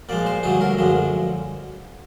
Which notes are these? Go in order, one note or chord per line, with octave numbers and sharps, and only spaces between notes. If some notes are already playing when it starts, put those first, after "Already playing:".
A#2 F3 G#3 D5
C5
G2 D3 F#3 A3 G#4
A#4
F#2 D3 F3 G#3